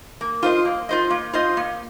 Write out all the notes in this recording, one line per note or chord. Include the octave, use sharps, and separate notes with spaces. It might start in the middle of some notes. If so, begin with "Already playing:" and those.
A#3
F4 C5 D#5
A#3
F4 C5 D#5
A#3
F4 C5 D#5
A#3